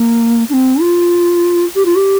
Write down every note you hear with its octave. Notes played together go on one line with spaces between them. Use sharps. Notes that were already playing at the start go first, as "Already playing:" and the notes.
Already playing: A#3
D4
C4
F4
G4
F4
G4